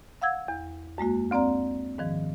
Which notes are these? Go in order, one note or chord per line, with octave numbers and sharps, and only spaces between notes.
F5 F#5 E6 G#6
E2
F#2 G#3 A#3 F#4
D2 C4 D5 A#5
G#2 D#3 F3